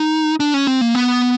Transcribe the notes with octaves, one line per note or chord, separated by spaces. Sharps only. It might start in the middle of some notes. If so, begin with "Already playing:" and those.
Already playing: D#4
D4
C#4
C4
A#3
B3